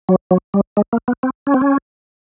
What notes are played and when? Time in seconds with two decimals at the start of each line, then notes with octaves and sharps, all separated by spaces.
0.09 F#3
0.31 F#3
0.54 G3
0.77 G#3
0.93 A#3
1.08 B3
1.23 C4
1.47 C#4
1.54 C4
1.61 C#4